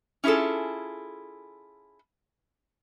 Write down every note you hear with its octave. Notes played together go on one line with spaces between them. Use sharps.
C#4 E4 F4 G#4 A4